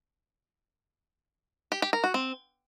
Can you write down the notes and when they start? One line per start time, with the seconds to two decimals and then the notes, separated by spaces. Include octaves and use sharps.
1.72 G4
1.82 G4
1.93 A#4
2.04 F#4
2.14 C4